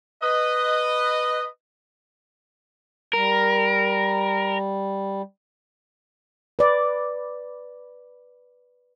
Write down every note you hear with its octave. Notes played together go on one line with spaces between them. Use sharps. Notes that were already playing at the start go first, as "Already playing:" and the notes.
B4 D#5
G3 A#4
B4 D5